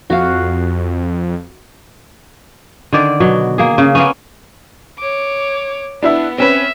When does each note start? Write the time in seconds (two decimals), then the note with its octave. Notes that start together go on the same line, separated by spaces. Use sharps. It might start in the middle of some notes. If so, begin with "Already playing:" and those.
0.10 F2 F#4 F5
2.93 D3 D#3 D5
3.20 B2 F#3
3.58 A#3 G#4
3.78 C#3
3.95 A#3 B3 C#4
4.99 C#5 D6
6.03 B3 D4 E4 E5
6.38 C4 C#4 B4 E5